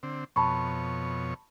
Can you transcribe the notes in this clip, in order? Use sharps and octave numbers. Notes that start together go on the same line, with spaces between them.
D3 C4
F2 B2 C#5 A5 B5 C#6